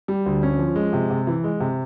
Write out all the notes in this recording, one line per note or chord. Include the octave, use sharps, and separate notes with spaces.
G3
D2
C#4
F3
G#3
C3
C3
E3
G#3
C3